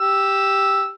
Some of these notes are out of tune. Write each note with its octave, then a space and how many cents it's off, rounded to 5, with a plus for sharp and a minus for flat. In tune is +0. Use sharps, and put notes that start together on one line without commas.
G4 +0 E6 +0